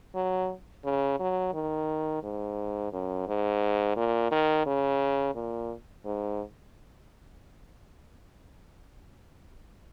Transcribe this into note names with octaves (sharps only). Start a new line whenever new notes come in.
F#3
C#3
F#3
D#3
G#2
F#2
G#2
A#2
D#3
C#3
A#2
G#2